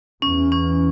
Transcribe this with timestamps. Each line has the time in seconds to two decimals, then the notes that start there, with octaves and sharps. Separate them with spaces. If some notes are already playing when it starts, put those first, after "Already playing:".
0.22 E2 C#4
0.52 C#4